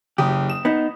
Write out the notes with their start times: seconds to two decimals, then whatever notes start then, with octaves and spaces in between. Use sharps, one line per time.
0.18 F#1 G4 D#6
0.49 E7
0.65 B3 D#4